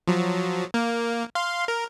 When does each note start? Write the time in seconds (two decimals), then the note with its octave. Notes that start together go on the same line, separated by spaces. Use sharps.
0.08 F3 F#3
0.74 A#3
1.35 F5 C6
1.68 A#4